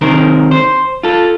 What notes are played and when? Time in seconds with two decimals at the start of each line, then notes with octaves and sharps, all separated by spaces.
0.01 C3 D#3 C4 A#4
0.51 C5
1.03 F4 A4